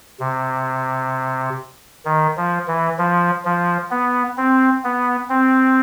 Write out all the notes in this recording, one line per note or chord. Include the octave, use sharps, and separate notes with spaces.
C3
D#3
F3
E3
F3
F3
B3
C4
B3
C4